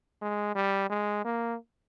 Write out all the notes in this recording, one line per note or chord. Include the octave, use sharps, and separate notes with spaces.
G#3
G3
G#3
A#3